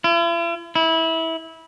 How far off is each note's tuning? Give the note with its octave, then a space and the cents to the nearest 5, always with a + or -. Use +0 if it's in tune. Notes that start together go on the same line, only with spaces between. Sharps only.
E4 +45
E4 -20